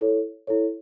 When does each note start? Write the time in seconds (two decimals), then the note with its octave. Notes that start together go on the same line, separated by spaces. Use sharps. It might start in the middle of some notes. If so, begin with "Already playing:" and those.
0.01 E4 A4 C#5
0.47 E4 A4 C#5